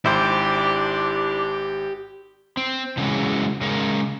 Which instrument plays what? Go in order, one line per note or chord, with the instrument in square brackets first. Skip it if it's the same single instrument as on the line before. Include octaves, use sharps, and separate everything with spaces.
[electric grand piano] G#1 [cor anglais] D4 [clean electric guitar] E4 C5 [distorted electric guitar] G4
[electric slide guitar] C4
A2 C#3 E3 F#3 G#3
C#3 G#3 A#4